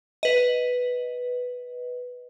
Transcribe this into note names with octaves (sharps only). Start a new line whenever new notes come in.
B4 D#5